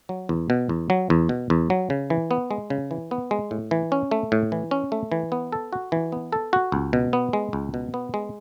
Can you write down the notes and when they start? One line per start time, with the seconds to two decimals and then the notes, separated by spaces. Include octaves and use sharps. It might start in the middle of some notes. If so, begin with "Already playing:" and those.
0.09 F#3
0.29 E2
0.50 B2
0.69 E2
0.90 F#3
1.10 E2
1.29 B2
1.50 E2
1.70 F#3
1.90 C#3
2.10 E3
2.31 B3
2.51 G#3
2.70 C#3
2.91 E3
3.11 B3
3.31 G#3
3.51 A2
3.71 E3
3.92 C#4
4.11 A3
4.32 A2
4.52 E3
4.71 C#4
4.92 A3
5.12 E3
5.32 B3
5.52 A4
5.73 F#4
5.92 E3
6.12 B3
6.32 A4
6.53 F#4
6.72 C#2
6.93 B2
7.13 B3
7.33 G#3
7.53 C#2
7.74 B2
7.94 B3
8.14 G#3